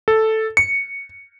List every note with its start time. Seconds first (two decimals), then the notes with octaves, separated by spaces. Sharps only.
0.08 A4
0.57 C#7